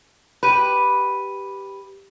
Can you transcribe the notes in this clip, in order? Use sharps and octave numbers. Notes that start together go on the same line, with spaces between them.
G4 B4 B5 D#7